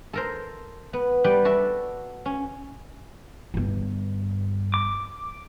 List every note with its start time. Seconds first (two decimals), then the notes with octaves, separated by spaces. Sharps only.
0.13 A4 A#4 C5
0.93 B3
1.24 G3 B4 D5 G5
1.45 F#4 A4 E5
2.25 C#4
3.54 G1 G2
4.74 D6